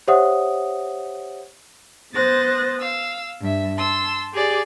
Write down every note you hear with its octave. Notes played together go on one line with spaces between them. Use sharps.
G4 C5 C#5 E5 F#5 D#6
B3 C5 D#6 F#6 A6 A#6
F5 E6
G2 E5
A5 C6 E6
G4 G#4 D5